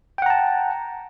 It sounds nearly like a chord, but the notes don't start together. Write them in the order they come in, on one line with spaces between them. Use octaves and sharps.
G5 F#5 A#5 A5